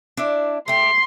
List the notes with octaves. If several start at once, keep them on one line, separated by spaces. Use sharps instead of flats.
D4 E4 D5
A3 G4 C6